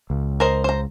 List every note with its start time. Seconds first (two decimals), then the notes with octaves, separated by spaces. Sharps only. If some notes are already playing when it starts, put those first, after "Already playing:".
0.10 C#2
0.40 A#4 C5 D#5
0.64 C5 A#5